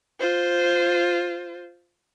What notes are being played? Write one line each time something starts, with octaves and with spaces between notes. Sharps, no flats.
F4 C5